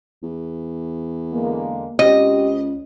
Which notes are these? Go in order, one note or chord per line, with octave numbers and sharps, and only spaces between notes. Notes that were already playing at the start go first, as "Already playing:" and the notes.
E2
D3 G#3 A#3
C#2 C4 F#4 G4 D#5